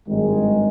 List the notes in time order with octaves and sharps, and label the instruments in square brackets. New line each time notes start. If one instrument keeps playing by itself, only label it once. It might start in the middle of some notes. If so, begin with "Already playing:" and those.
[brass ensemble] G#1 G2 D#3 G#3